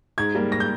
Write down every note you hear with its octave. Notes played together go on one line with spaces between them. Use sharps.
G#2 G#6
G3 A#3
A#6
G6